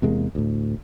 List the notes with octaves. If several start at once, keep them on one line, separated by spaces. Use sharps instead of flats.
E2 C3 G#3 A#3
D2 A2